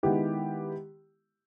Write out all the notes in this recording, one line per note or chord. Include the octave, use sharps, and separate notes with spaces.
D#3 G#3 B3 E4 G4